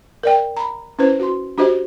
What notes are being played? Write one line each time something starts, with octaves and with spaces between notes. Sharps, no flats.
A#4 D5 G5
A#5 B5
C#4 E4 B4 C5
F#4 C6
D4 F#4 G4 C5 D#5